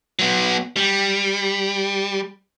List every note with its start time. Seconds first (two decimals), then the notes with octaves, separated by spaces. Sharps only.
0.19 F#3 B3
0.77 G3